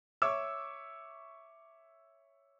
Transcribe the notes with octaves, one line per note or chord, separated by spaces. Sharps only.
C#5 E5 C#6 D6 E6